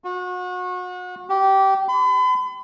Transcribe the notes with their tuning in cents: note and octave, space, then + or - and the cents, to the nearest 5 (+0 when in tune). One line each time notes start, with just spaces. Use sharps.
F#4 -35
G4 -20
B5 +40